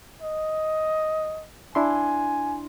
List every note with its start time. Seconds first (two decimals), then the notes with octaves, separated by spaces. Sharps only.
0.22 D#5
1.75 D4 E4 G#5 C6